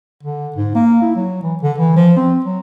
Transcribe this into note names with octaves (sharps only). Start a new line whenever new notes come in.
D3
G#2
A#3
E4
F#3
E3
D3
E3
F3
C4
F#3